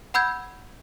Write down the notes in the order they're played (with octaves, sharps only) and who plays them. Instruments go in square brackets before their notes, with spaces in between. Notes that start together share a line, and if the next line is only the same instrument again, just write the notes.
[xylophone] F#5 B5 E6 G6 G#6